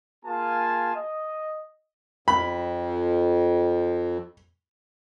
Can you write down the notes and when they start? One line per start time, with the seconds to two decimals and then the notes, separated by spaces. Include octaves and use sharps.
0.24 A#3 F4 G#4 F5 G#5 A5
0.95 D#5
2.28 F2 B5